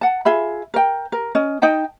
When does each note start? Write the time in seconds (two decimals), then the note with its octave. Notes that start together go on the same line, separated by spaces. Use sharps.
0.01 F#5 A5
0.25 F4 G#4 E5 B5
0.74 A#4 G5
1.12 A#4
1.35 C#4 D#5
1.62 D#4 D#5 G5 A5